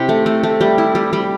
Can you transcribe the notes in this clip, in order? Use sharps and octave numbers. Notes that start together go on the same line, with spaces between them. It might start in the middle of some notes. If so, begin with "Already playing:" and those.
Already playing: C3 E4 G4
A3
A3
A3
G3
E4
G3
G3